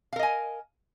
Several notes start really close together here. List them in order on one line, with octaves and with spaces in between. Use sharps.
F5 A#4 D#5 G#5